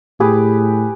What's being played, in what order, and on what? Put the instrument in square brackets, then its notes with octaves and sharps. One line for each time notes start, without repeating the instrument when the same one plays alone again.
[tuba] A2 [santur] G4 G#4 B4